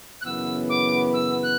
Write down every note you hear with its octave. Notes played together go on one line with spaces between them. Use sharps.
F#6
F#2 C#3 E3 B3 E6
D6
E6
F#6